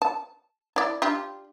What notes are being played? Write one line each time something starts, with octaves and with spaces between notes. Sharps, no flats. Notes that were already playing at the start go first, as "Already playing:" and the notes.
A5
E4 D5
D4 F4 G4